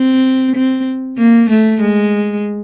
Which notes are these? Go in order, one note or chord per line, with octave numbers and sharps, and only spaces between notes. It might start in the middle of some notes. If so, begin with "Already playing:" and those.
Already playing: C4
C4
A#3
A3
G#3